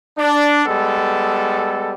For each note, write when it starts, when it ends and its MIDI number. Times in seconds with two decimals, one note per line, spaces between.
0.17 0.64 62
0.65 1.93 55
0.65 1.93 56
0.65 1.93 59
0.65 1.93 69